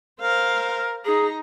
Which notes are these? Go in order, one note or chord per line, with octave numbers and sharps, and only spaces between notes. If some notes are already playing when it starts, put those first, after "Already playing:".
A#4 C5 F5
D#4 G#4 A#5